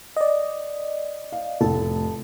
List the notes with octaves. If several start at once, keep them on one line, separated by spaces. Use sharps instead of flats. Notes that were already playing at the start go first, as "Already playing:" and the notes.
D5 D#5
F5
F1 A2 A4 A5